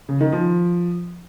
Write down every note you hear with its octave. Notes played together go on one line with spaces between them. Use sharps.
C#3
D#3
F3